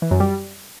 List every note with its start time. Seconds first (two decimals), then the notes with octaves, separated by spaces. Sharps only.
0.02 E3
0.11 F#2
0.20 G3